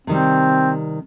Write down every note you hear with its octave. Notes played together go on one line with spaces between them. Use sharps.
C3 D#3 G3 C4